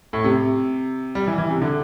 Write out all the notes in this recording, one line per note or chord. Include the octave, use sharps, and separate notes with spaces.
A2
C3
G3
E3
E3
C3
D3